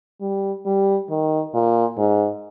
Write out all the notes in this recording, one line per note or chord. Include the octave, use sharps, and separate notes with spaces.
G3
G3
D#3
A#2
G#2